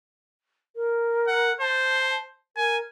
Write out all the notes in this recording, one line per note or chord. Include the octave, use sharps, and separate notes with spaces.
A#4
F#5
C5 A5
A#4 G#5